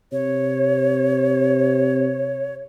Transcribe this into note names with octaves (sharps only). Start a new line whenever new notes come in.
C3 C#5